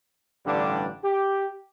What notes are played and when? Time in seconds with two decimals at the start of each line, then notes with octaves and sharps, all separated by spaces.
0.45 A1 G2 D3 G3 D4
1.04 G4